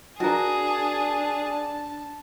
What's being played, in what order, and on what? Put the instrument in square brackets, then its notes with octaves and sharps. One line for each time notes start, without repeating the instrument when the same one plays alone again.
[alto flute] D4 [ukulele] F#4 A#4 [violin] G#4 [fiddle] A5